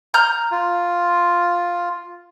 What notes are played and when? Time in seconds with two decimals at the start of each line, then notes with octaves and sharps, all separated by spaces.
0.14 A#5 F6 G6
0.51 F4